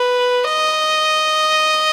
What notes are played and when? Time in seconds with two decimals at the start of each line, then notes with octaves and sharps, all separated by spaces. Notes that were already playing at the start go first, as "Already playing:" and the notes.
Already playing: B4
0.44 D#5